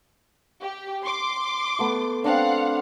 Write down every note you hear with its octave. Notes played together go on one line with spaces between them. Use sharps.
G4
C6 D6
A3 B3
C4 D4 F5 F#5